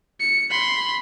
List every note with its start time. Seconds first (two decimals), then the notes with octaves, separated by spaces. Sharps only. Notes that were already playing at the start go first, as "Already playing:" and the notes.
0.20 C#7
0.51 B5 C6